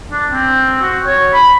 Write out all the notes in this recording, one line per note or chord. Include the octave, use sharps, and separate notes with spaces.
D4
C4
F#4
C#5
B5